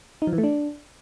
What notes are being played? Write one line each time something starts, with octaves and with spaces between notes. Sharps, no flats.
D#4
F3
E3
A3
D4